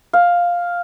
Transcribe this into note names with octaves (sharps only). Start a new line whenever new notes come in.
F5